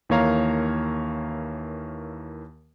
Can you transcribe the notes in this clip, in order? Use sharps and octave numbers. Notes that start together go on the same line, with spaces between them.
D#2 E3 A#3 C#5 F5 A#5